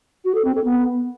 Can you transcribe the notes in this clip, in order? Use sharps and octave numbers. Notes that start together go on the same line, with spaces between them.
F#4
A4
C4
A4
B3